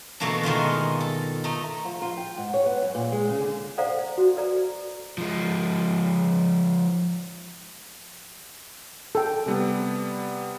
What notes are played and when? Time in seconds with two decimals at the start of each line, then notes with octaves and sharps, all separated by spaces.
0.20 B2 E3 A3 A#3 D4
0.43 B2 D#3 G#3 F4
1.00 A4
1.44 A3 D#4
1.85 F3
2.02 F4
2.17 G5
2.38 G#2
2.54 C#5
2.66 B3
2.82 F#2
2.95 A#2
3.12 G#3
3.29 C#3
3.41 D3
3.78 A4 C5 D5 F5 F#5 A#5
4.18 F#4
4.37 A4 B4 D5 A#5
5.18 F3 G#3
9.15 A4 G5
9.46 C3 G3 B3